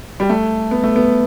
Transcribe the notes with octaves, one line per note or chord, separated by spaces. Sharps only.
G3
A3
B3
A3
B3